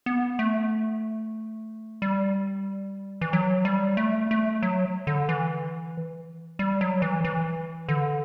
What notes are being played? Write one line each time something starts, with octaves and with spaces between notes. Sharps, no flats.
B3
A3
G3
E3
F#3
G3
A3
A3
F#3
D3
E3
G3
F#3
E3
E3
D3